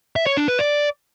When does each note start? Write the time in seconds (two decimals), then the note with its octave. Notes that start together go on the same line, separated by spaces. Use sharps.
0.16 E5
0.27 C#5
0.37 D4
0.48 B4
0.59 D5